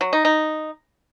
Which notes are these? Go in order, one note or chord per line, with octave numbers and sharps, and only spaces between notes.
F#3
D#4
D#4